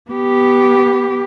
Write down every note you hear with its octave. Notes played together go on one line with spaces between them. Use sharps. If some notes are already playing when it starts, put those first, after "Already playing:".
B3 G4